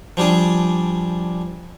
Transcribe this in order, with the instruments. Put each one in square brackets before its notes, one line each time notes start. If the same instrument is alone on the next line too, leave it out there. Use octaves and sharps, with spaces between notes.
[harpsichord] F3 G3 D4 G#4